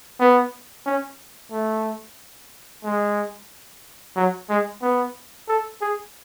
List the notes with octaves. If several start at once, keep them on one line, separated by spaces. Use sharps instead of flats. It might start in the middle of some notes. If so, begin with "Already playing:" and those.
B3
C#4
A3
G#3
F#3
G#3
B3
A4
G#4